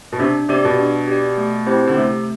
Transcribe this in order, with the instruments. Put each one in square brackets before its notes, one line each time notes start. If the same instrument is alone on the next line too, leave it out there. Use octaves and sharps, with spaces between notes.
[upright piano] B2
[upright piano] C3 [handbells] D4
[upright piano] C3 [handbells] G4 D5
[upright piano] B2
[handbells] D4
G4 D5
A3
C4 E4 G4 C5
[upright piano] D3
[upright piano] C3 [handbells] A3